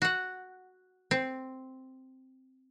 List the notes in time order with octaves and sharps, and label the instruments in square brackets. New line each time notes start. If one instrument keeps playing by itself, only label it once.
[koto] F#4 F#5
C4